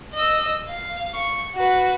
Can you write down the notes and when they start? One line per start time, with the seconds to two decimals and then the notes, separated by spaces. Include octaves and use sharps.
0.14 D#5 E6
0.69 F5
1.14 C#6
1.55 F#4 B4